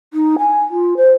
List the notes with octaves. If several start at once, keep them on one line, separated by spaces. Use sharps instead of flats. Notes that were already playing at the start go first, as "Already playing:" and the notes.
D#4
G#5
F4
C5